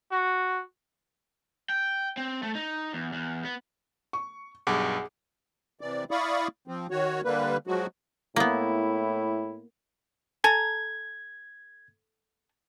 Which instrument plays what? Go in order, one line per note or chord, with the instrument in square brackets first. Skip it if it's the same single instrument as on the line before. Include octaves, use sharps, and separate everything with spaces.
[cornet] F#4
[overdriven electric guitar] G5
C4
A3
D#4
E2
E2
B3
[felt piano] C#6
[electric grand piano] B1 G2 D6 [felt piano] G#4 F#5
[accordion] C3 E3 D5
E4 D5 F5 B5 C#6 D#6
F3 C4
D#3 F#4 C#5
D3 G3 A#3 B4
F3 F#3 G#3 F#4
[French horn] A2 [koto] A#3 B3 [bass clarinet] E4
[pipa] A4 G#5 A#5 [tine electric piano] G#6